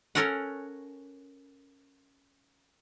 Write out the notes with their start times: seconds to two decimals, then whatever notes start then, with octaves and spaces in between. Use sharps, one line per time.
0.15 C#4 A4 A#4 C#5 F#5